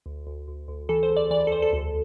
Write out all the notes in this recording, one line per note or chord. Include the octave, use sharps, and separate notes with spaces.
D2
D2
D2
D2
E3 A4
C5
E2
D5
E3 D5
D5
A4
E2 C5
A4
D2 A4